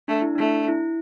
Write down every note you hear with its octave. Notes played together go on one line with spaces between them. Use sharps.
A3 D4
E4
A3 D4
E4